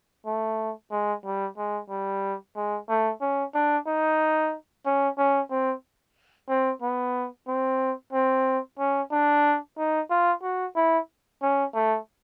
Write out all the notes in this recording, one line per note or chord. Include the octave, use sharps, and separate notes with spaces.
A3
G#3
G3
G#3
G3
G#3
A3
C#4
D4
D#4
C#4
C#4
C4
C4
B3
C4
C4
C#4
D4
D#4
F4
F#4
E4
C#4
A3